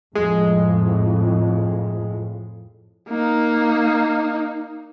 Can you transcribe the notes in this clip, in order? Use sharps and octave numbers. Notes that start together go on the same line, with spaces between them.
F2 A2 G#3
A#3 D#4